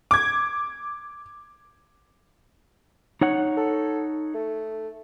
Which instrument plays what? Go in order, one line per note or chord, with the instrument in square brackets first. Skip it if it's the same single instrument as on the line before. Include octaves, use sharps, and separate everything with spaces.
[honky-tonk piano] D6 G#6
[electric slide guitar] D#4 C#5 F#5
[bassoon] A4
A3